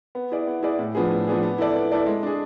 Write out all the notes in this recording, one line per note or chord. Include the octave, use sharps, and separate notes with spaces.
B3
E4 G#4 D5
B3
E4 G#4 D5
A2
F3 B3 D4 G#4
A2
F3 B3 D4 G#4
B3
E4 A4 D5
B3
E4 A4 D5
G#3
D4 G#4